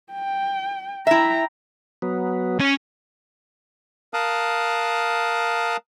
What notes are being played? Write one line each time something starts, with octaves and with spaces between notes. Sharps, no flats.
G5
E4 E5 G5 A#5
F#3 B3
C#4
A#4 F5 A5 D#6 F#6